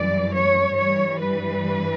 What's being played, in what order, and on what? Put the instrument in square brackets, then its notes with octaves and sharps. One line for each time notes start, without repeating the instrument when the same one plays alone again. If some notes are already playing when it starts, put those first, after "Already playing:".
Already playing: [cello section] F#2 E3 G3 D5
C#5
G2 E3 G3 C#5
B4